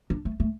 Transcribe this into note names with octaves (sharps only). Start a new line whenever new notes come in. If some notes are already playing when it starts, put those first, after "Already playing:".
D4
A3
A3